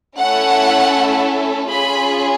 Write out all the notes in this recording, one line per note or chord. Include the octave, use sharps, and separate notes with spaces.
A3 C#4 E4 A4 F#5
C#4 F4 G#4 B5